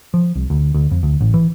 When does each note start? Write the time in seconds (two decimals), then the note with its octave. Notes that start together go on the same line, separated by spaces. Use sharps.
0.14 F3
0.35 C2
0.50 D2
0.74 D2
0.91 F2
1.03 D2
1.21 A1
1.34 E3